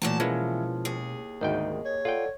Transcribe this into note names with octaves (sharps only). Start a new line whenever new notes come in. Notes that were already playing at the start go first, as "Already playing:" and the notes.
A#2 E3 F#3 A3 A#3 A5
B2 E3 F3 G#3 A#3 C#4
D#2 G#4
G#1 D2 D#4 A#4 D#5 G5
C#5
F4 A4 D5 F#5 G5